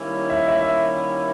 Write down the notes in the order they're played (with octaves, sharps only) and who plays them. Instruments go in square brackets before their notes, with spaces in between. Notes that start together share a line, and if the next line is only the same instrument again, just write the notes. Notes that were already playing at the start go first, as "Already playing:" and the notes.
Already playing: [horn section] D#3 G3 A#3 C#4 E4
[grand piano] E5
E5